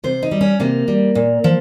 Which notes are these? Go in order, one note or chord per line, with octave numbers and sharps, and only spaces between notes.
C3 C5
D#4
G3
C#4
C3 A#3
G3
A#2
F3